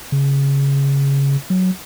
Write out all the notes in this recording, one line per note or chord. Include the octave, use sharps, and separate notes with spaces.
C#3
F#3